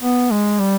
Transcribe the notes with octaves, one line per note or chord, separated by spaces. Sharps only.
B3
G#3
G3